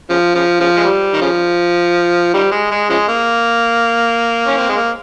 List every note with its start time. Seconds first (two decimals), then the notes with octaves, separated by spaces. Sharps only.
0.10 C#3 F3
0.35 C#3 F3
0.60 C#3 F3
0.76 G#3
0.84 G3
1.13 D#3
1.21 C#3 F3
2.34 D#3 G3
2.52 G#3
2.71 G#3
2.90 C#3 F3 G#3
3.08 A#3
4.47 C#4
4.58 C4
4.69 G#3
4.76 A#3